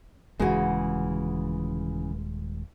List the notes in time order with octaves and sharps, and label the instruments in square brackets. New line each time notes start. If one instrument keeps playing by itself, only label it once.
[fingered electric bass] D#1 G#3 [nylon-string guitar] C#3 E3 F#4